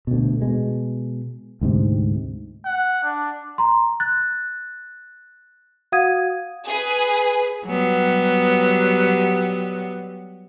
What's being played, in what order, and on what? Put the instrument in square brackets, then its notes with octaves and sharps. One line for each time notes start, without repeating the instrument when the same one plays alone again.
[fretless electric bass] D2 B2
B2 G#3
D2 G#2 C3
[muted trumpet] F#5
D4
[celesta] A#5 C6
F#6 A6
F#4 F5 F#5 D#6 G#6 D#7
[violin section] G#4 B4
[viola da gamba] F#3 G3 B3